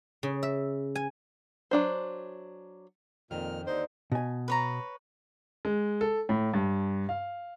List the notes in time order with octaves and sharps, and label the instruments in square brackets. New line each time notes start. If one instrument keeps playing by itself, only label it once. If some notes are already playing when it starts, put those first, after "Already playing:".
[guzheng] C#3
E5
G#5
[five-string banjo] F#3 D4 C5
[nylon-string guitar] F2 D#3 [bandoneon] A#2 F6
[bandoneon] D#2 D3 D#4 [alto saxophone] C5 [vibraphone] D5
[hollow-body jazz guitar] B2 G#5
[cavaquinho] B4 C#5 A#5
[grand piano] G#3
A4
A2
G2
F5